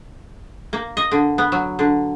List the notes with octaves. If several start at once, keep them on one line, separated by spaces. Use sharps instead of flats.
A#3
D#5
D3
B3
F#3
D3